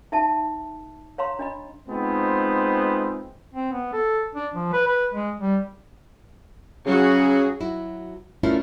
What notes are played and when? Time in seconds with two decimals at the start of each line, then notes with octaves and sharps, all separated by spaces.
0.12 D#4 E5 A5
1.18 C#5 F5 A#5 C6
1.39 D4 D#5 B5
1.89 G#3 B3 C4 D#4 F4 C5
3.53 C4
3.72 B3
3.93 A4
4.35 D4
4.54 F3
4.73 B4
4.87 B4
5.13 G#3
5.39 G3
6.86 C#3 F#3 F#4 G#4
7.60 F#3 E4 F#4
8.43 A3 C#4 D4 E4 F4 A#4